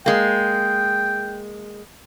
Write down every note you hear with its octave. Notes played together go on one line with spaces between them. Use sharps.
G#3 A#3 G5